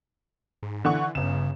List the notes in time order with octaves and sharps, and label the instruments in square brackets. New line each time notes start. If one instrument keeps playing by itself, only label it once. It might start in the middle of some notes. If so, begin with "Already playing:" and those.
[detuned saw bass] G#2
[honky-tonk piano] D3 F#5 C#6 [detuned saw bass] E3
[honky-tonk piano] G1 E7 [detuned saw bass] C#3